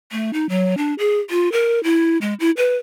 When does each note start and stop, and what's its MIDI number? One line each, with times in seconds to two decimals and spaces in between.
0.12 0.33 57
0.33 0.49 63
0.49 0.77 54
0.77 0.94 62
0.99 1.19 68
1.30 1.51 65
1.52 1.82 70
1.84 2.18 64
2.21 2.34 56
2.40 2.51 64
2.57 2.76 71